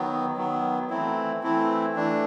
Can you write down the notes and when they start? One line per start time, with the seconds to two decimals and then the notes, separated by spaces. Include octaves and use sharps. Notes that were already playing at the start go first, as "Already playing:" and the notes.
Already playing: D#3 F#3 B3
0.37 D#3 F#3 B3
0.90 E3 A3 C4 E4
1.42 E3 A3 C4 E4
1.96 E3 A3 D4